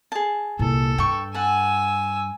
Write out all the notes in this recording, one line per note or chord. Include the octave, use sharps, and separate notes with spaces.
G#4 A5
C2 A#2 A4
G2 G5 C#6
F#5 G#5 A5 E6